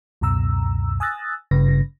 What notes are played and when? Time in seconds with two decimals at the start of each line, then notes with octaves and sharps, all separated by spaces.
0.21 C#2 F#2 B2 A#5 E6
1.00 G#5 D#6 E6 F#6 A6 A#6
1.51 G#1 G2 C#3 B4 A#6